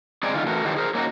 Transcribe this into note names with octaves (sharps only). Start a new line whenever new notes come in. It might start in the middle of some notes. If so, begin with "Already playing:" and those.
G#3 C4 D#4 G#4 D5
D3 D#3 F4
E3 A3 F#4 A#4
D#3 E3 F#3 F4 G4
G#4 A#4 C5
A#3 C#4 D#4 E4 F#4